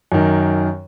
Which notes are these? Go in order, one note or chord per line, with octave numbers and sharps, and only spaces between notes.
F#2 D#3